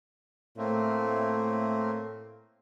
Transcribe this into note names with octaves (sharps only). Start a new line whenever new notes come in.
A2 A3 A#3 C4